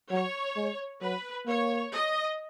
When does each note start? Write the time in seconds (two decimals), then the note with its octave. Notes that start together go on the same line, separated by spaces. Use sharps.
0.11 F#3 C#5
0.56 G#3
1.01 F#3 B4
1.46 A#3 C#5
1.92 D#5